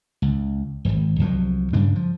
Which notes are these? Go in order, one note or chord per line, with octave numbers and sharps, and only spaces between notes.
C#2
D1 G#1
C2 F3 F#3
G2 C#3 G3 D4
F3